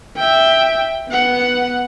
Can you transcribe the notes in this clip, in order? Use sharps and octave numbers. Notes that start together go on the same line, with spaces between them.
E5 G5
B3 F#5